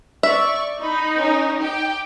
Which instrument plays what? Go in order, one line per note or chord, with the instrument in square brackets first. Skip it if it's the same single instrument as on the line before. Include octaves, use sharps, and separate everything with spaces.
[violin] D5 C#6 [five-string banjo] E5
[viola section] D#4 [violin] B5
[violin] C#4 A#4
G4 G5